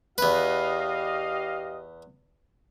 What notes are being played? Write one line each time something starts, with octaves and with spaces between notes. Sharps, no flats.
E2 G4 B4 D#5 F5